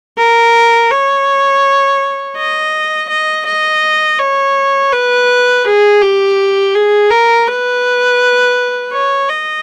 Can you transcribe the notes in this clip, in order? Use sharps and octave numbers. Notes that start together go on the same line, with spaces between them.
A#4
C#5
D#5
D#5
D#5
C#5
B4
G#4
G4
G#4
A#4
B4
C#5
D#5